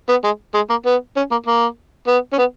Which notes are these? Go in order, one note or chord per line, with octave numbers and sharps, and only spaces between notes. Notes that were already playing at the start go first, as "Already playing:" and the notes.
B3
G#3
G#3
A#3
B3
C#4
A#3
A#3
B3
C#4
B3